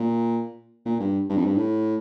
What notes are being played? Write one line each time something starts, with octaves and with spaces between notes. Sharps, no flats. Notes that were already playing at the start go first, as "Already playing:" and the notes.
Already playing: A#2
A#2
G2
G2
F2
G2
A2